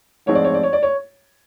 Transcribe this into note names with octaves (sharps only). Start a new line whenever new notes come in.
A1 G#2 F3 G#3 C4 C#5
D5
C#5
D5
C#5
D5
C#5